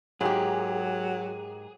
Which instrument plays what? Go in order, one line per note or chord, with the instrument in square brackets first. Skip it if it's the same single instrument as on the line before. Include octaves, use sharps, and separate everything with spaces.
[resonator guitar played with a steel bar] G#2 A#3 G4 [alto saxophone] F#3 [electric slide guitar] G#4